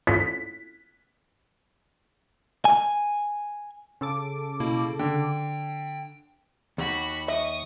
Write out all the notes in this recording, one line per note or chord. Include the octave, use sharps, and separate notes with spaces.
B6
G#5
C#3 A4 D6
B2 A#3 E4
D3 G5
D#2 F#4 B5
D#5 E5 C#6 D#6